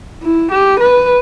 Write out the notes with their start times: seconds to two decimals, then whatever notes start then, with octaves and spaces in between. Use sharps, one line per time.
0.23 E4
0.52 G4
0.80 B4